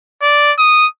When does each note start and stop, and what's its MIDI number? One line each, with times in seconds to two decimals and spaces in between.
0.22 0.52 74
0.59 0.87 87